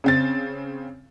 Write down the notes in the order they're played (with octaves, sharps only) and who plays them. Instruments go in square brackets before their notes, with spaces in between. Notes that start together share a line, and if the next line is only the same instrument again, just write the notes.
[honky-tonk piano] C#3 C4 A6